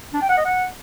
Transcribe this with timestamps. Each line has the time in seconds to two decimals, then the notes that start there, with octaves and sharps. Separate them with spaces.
0.14 D4
0.22 G5
0.29 F#5
0.37 D#5
0.45 F#5